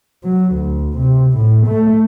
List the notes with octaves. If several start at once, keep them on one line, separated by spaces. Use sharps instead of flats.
F#3
D2
C3
A2
A3